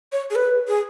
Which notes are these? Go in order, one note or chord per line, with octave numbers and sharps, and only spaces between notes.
C#5
G#4
B4
G#4